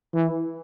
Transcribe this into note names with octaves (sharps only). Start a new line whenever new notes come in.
E3